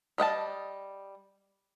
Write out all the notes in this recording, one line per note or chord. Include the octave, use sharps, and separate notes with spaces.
G3 D#5 F#5 A5